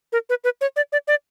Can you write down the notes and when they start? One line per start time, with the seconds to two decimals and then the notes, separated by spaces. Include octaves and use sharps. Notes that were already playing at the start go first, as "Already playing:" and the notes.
0.12 A#4
0.29 B4
0.44 B4
0.61 C#5
0.76 D5
0.92 D5
1.07 D5